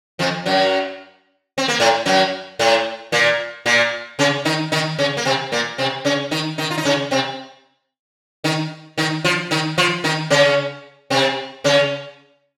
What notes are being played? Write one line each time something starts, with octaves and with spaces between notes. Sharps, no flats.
F2 F3
F#2 F#3
C4
A#3
A2 A3
F#2 F#3
A2 A3
A#2 A#3
A#2 A#3
C#3 C#4
D#3 D#4
D#3 D#4
C#3 C#4
A#3
C3 C4
A#2 A#3
C3 C4
C#3 C#4
D#3 D#4
D#3 D#4
F4
D#4
C#3 C#4
C3 C4
D#3 D#4
D#3 D#4
F3 F4
D#3 D#4
F3 F4
D#3 D#4
C#3 C#4
C3 C4
C#3 C#4